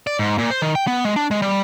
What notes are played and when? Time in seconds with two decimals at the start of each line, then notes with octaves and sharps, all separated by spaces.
0.07 D5
0.19 G#2
0.38 A#2
0.50 C5
0.62 D#3
0.75 G5
0.87 B3
1.05 G#3
1.16 D4
1.31 G#3
1.42 G3